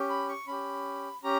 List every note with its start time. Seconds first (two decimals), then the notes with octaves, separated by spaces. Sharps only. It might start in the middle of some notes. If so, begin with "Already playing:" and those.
Already playing: C#4 G4
0.09 B5
0.29 C#6
0.47 C#4 G4 B5
1.23 C#4 G4 A#5